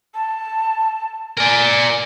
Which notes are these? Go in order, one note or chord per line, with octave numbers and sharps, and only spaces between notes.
A5
A#4 D5 G#5